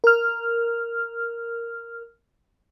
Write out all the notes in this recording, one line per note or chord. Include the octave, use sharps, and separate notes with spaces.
A#4 F6